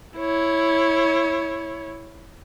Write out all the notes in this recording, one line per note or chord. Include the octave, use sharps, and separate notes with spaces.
E4 C#5